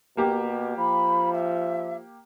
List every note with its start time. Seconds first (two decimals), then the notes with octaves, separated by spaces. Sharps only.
0.17 B2 A#3 G4
0.78 F3 B5
1.33 E5